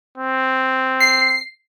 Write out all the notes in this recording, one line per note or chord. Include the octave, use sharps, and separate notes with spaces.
C4
C7